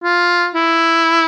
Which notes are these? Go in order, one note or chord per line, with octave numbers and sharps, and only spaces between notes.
F4
E4